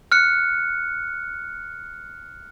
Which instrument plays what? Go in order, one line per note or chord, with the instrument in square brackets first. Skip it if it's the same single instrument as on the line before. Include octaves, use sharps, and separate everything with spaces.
[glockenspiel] F6 F#6 C#7